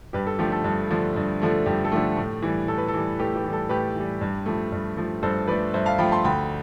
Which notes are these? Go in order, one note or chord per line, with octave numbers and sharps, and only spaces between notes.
G2 G4 B4
A4
D3 F3 A3 G4
A4
G2
D3 F3 A3
G2
D3 F3 A3
G2 G4
A4
D3 F3 A3 G4
A2
E3 G3
A2 A4
B4
A4
E3 G3
A2 G4 B4
G4 B4
E3 G3
A4
A2 G4 B4
E3 G3
G2
F3 A3
G2
F3 A3
G2 A4 C5
F3 A3 B4 D5
G2 C5 E5
F5 A5
F3 A3 G5 B5
A5 C6
D2 G5 B5